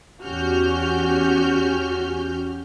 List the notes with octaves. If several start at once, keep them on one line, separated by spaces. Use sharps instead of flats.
E2 C#4 F#4 G4 F6 G6